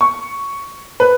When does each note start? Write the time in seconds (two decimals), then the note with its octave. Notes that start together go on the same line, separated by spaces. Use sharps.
0.01 C#6
1.00 B4